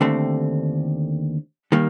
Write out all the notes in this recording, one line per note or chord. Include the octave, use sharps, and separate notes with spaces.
D#2 D3 A3 C4
D#3 G3 A#3